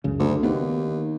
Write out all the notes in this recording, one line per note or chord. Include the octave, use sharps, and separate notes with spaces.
C#2 F#2 C#3
D2
D#2 B3